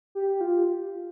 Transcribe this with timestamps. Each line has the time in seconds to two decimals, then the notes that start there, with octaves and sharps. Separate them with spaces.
0.15 G4
0.41 F4